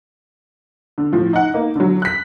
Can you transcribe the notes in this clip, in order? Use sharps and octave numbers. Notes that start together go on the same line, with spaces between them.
D3
A2 F3
D#4 F#5
A#3 D#4
D3 F#3
F#6 B6